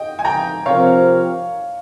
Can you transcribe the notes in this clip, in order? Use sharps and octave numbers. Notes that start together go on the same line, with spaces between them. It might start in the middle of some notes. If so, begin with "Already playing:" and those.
Already playing: D#5 G5
G#5
G5 A#5
C3 F3 C4 G4 A#4 C#5 F5